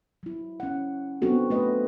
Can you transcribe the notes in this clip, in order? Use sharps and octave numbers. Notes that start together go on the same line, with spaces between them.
F#3 E4
C#4 F#5
F#3 B3 C4 D4 F#4 A4
A3 B4 D#5